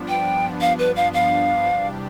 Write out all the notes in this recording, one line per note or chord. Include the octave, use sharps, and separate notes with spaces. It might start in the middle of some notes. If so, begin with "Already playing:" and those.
Already playing: G2 F3 B3 D4
G5
F5
B4
F5
F5
E2 C3 G3 D4 G4